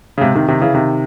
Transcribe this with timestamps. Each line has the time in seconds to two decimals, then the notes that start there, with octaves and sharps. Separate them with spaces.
0.18 C#3
0.21 G#2 C3
0.35 C3 D#3
0.48 C3 D#3
0.60 C#3 E3
0.74 C3 D#3